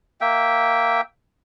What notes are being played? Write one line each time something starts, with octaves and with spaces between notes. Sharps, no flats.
A#3 E5 G5